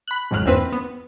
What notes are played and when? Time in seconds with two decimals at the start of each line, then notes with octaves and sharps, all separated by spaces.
0.08 B5 F#6
0.31 G#1 F2 G#2 F#3 F6 F#6
0.46 E2 A#3 C4 B4
0.72 B3